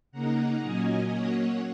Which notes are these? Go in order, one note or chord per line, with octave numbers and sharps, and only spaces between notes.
C#3 A#3 D#4 F#5 A#5
A#2 F#3 A#3 C#4 D#5 G#5
F#3 A#3 C#4 C#5 F#5